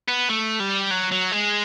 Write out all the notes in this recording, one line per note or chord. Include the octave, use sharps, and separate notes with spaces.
B3
A3
G3
F#3
F#3
G#3